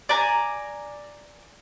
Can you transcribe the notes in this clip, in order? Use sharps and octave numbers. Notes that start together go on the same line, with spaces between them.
D5 G#5 A#5